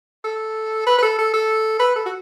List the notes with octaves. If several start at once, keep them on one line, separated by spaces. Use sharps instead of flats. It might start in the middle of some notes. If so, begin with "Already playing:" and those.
A4
B4
B4
A4
A4
A4
B4
A4
F#4